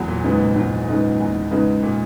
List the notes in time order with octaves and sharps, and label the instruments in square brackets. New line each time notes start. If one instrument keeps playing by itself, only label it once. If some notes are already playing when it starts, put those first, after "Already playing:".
Already playing: [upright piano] E2 [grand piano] F#3
[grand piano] A#2
[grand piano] G#2 [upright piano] C#3 G#3 B3 D#4
[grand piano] A#2
[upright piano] E2 [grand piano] G#2
[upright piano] C#3 G#3 B3 D#4
E2
C#3 G#3 B3 D#4
[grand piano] A#2